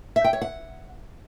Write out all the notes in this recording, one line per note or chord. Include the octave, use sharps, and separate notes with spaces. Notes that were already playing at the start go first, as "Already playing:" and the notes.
E5
G5
C#5
F#5